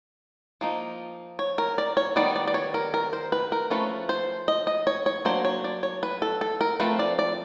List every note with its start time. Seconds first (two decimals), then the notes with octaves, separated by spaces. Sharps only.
0.61 F3 A#3 D#4
1.39 C#5
1.58 A#4
1.78 D5
1.97 C#5
2.16 D#3 G3 B3 D5
2.36 D5
2.48 D5
2.54 C#5
2.74 A#4
2.94 A#4
3.13 C5
3.32 B4
3.52 A#4
3.70 F3 A3 C#4 B4
4.09 C5
4.48 D#5
4.67 D#5
4.87 C#5
5.06 C#5
5.25 F#3 A#3 D4 C5
5.45 C#5
5.64 D5
5.83 C#5
6.03 B4
6.22 A4
6.41 A4
6.61 A#4
6.80 F3 A3 C4 B4
6.99 D5
7.19 D5